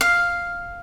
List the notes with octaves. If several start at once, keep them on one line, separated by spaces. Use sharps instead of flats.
F5